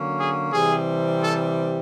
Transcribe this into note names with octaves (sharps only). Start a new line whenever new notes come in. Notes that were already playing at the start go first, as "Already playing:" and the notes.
Already playing: D3 F#3 A#3 C#4
G#4
C3 E3 G3 C4 G#4
A4